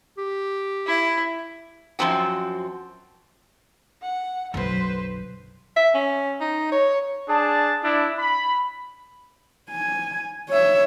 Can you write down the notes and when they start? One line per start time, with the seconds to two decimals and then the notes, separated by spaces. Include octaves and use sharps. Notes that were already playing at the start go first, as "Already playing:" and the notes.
0.18 G4
0.87 E4
1.99 F#2 A#2 F3 C4 F#4
4.02 F#5
4.54 F#1 B1 D3 F#3 B4 C5
5.76 E5
5.94 C#4
6.40 D#4
6.72 C#5
7.28 D4 G#4 A5
7.84 D4 E4
8.19 B5
9.70 G#5
10.49 C#5 E5